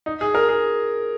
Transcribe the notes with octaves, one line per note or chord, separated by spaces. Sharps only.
D#4
G#4
A#4
G#4